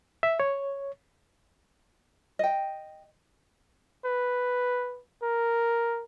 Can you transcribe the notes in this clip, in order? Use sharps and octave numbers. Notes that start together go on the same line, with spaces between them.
E5
C#5
D#5 G5
B4
A#4